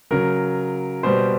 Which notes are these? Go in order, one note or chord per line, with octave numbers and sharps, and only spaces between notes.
C#3 F#3 A#4
B2 G3 C5